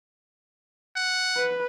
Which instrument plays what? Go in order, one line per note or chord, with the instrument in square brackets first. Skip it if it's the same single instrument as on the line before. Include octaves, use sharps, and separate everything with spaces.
[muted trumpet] F#5
[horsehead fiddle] B4